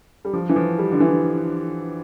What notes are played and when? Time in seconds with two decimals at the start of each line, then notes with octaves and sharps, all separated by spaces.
0.25 G3
0.33 F3
0.49 E3
0.56 F3
0.79 G3
0.92 D3
1.00 E3